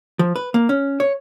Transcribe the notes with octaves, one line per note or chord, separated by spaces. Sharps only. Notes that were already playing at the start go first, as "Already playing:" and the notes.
F3
B4
A#3
C#4
C#5